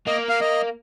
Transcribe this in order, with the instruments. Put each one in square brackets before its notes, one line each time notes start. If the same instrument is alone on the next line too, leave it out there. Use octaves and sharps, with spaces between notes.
[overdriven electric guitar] A#3 [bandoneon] D#5
[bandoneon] F5
D#5